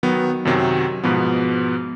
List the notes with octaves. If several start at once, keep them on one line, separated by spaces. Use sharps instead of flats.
D#3 F#3 B3
F#2 C3 D#3 F#3
G#2 B2 F3 B3